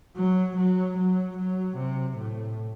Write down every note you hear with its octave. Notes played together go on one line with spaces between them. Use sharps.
F#3
F#3
F#3
F#3
C3
A2